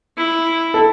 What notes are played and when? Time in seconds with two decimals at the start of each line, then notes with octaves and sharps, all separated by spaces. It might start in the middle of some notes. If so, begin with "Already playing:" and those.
0.17 E4
0.74 A4